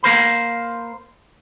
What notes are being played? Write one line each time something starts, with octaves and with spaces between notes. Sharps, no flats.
A#3 A#4 C5 B5